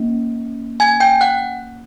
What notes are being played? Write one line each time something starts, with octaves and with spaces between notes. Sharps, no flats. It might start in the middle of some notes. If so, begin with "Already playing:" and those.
Already playing: A#3 C#4
G#5 G#6
G5 G6
F#5 F#6